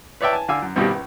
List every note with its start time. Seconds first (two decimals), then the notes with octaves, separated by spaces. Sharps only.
0.21 B4 C#5 D5 E5 G5 A5
0.33 G#5 A5
0.48 D3 F5 G#5 D6 E6
0.62 F#2
0.76 C2 G2 B2 D#3 G3
0.90 C#2